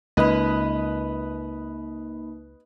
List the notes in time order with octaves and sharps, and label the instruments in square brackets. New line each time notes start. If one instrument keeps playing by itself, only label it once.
[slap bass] C#2 [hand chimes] A#3 D#4 B5 [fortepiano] B4 D#5